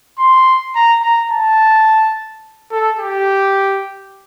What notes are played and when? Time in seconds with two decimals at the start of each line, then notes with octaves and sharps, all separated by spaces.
0.19 C6
0.75 A#5
1.02 A#5
1.31 A5
2.71 A4
2.99 G4